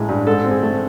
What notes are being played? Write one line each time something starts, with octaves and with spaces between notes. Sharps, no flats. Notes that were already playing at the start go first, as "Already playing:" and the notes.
Already playing: A1 E3 G#3
G2
G#2 A4
C4
G#4
A3